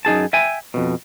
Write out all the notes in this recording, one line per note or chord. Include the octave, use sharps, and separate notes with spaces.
F#2 D#4 G#4 A5
E5 G5 G#5
F2 B2